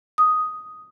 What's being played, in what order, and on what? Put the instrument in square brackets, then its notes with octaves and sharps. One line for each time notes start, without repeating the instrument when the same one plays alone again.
[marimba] D#6